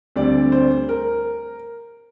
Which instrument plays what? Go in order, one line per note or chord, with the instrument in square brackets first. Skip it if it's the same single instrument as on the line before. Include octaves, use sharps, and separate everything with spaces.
[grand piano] D2 D3 G3 C4 D5
C5
A#4